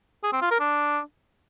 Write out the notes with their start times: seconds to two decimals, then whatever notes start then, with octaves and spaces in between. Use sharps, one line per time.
0.23 G#4
0.33 C4
0.42 F4
0.51 A#4
0.60 D4